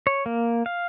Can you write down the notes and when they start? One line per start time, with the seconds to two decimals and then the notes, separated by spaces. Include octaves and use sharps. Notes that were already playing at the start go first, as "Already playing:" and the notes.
0.07 C#5
0.26 A#3
0.66 F5